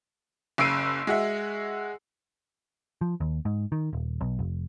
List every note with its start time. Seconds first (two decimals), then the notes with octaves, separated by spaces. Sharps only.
0.58 F#1 C#3 E6 C7 D7 D#7
1.07 G#3 F#4 E5
3.01 F3
3.20 D#2
3.45 G#2
3.72 D#3
3.93 D#1
4.21 B1
4.39 F1